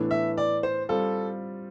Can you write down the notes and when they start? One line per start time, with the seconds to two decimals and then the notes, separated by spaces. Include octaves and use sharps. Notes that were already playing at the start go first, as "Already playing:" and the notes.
Already playing: A2 E3 B3 D4 A4
0.11 E5
0.38 D5
0.63 C5
0.89 G3 C4 F4 A4